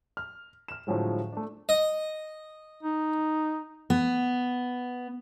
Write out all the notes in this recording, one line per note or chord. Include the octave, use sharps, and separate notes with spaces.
F6
F6 E7
A2 D3 F3 F#3 G#3
A3 D4
D#5
D#4
B3